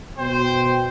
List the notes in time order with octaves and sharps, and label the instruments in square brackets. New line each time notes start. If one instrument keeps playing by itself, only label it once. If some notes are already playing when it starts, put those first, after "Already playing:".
[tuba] B2 [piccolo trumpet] C5 [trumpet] G5